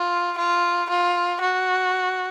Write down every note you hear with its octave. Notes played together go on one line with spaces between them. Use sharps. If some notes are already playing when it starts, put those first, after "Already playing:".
Already playing: F4
F4
F4
F#4